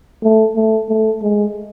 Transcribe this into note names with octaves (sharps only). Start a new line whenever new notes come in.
A3
A3
A3
G#3